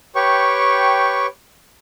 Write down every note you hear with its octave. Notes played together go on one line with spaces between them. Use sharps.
G4 B4 C#5 G5 C#6